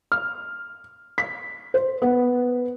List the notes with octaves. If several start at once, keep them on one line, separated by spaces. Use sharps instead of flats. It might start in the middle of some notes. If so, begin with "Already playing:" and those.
F6
B6
C5
B3